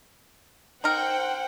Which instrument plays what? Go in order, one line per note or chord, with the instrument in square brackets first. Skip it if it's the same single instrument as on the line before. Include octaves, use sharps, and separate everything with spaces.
[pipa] D#4 A#4 [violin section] C5 F#5 G5